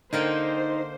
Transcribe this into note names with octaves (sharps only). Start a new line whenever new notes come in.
D3 A#3 D#4 C5 G5